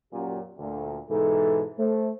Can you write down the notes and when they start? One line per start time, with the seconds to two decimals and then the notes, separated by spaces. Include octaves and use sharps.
0.13 F#2 A#2 F#3 G4
0.59 D2 A#2
1.09 G#2 B2 E3 D#4 A4
1.78 A3 C5